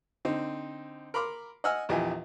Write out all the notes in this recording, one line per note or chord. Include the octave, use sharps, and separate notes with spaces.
D3 C4 D#4
A#4 B5 C6 D6 F6
D#5 F#5 G#5 E6 F6
A#1 E2 G4 D#5 E5 G#5